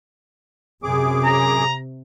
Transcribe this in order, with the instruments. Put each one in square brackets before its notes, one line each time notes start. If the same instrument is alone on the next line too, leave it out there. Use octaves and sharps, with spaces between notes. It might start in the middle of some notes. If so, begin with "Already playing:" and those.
[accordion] F#2 G#4 D6 [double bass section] C3
[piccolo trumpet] A#5